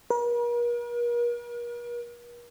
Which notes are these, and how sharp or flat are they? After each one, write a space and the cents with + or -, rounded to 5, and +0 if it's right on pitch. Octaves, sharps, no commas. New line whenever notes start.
A#4 +45